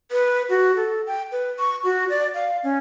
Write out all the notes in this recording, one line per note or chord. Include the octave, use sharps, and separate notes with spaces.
B4
F#4
A4
G5
B4
C#6
F#4
D5
F5
C#4